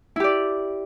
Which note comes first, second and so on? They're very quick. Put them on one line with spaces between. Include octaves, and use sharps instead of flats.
E4 G4 D5